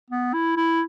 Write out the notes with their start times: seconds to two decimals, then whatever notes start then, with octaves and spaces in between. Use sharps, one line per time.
0.10 B3
0.33 E4
0.57 E4